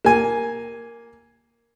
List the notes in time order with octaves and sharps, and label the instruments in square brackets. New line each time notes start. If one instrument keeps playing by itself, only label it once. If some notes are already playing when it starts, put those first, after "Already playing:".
[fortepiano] A#3 G#5